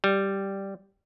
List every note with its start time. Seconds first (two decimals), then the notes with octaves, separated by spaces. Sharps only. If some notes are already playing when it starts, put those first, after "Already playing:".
0.04 G3